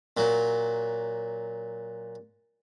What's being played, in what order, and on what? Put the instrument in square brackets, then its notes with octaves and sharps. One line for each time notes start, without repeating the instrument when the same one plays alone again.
[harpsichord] A#2 F#3